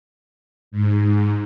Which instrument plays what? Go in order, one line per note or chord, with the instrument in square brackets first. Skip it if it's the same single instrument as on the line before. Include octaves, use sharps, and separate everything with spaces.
[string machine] G#2